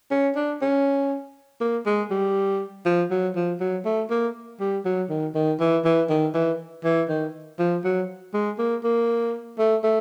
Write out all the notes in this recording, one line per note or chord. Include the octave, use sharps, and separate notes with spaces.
C#4
D4
C#4
A#3
G#3
G3
F3
F#3
F3
F#3
A3
A#3
G3
F#3
D#3
D#3
E3
E3
D#3
E3
E3
D#3
F3
F#3
G#3
A#3
A#3
A3
A3